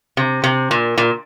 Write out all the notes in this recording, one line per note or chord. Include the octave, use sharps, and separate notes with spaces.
C3
C3
A#2
A#2